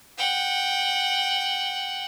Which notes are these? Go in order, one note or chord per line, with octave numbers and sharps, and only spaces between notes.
F#5 G5